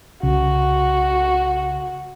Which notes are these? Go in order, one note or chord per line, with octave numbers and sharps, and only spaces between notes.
C2 C#3 F#4